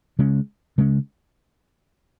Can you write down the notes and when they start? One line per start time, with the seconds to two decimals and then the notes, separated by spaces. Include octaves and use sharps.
0.19 C#3 G#3 C#4
0.78 C#3 G#3 C#4